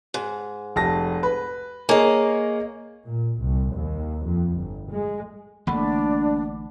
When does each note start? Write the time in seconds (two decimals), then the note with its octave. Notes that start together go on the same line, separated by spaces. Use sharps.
0.14 G#2
0.76 F1 A5 A#6
1.23 B4
1.89 A#3 G#4 A#4 C#5 D#5
3.06 A#2
3.40 C2
3.75 D#2
4.25 F2
4.56 G1
4.90 G#3
5.67 A1 D3 A3 A#3 D4 F#5 B5